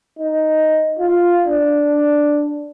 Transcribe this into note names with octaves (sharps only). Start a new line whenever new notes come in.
D#4
F4
D4